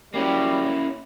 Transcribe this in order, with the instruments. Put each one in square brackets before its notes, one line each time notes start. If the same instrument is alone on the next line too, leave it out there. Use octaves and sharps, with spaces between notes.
[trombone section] F#3 G3 [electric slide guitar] A#3 C#4 E4